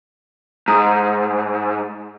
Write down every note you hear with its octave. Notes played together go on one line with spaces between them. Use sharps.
G#2 A#5 D#6